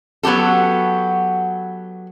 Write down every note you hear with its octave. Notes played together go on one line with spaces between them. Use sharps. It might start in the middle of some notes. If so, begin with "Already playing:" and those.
F#3 B3 F#4 G4 A4